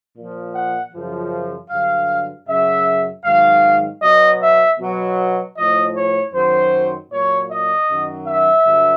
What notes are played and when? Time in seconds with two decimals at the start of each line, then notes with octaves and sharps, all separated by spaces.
0.16 A#2 F3
0.54 F#5
0.93 F#2 C#3 F3
1.69 G2 D3 F#3 F5
2.48 F#2 C#3 F#3 E5
3.24 G#2 D#3 F#3 F5
4.01 B2 F#3 D#5
4.40 E5
4.78 B2 F#3
5.56 A2 F3 D#5
5.95 C#5
6.33 F#2 D#3 F#3 C5
7.10 A#2 F#3 C#5
7.48 D#5
7.88 F#2 D#3 F#3
8.26 E5
8.64 G2 D3 F#3